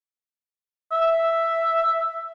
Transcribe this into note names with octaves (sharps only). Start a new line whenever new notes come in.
E5